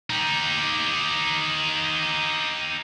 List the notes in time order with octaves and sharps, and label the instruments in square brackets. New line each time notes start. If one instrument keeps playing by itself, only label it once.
[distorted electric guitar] D#4 G4